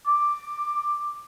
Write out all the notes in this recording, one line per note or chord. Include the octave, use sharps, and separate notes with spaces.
D6